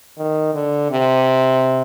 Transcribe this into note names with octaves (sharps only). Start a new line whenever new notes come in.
D#3
D3
C3